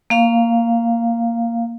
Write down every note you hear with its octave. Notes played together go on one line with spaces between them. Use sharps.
A#3 F5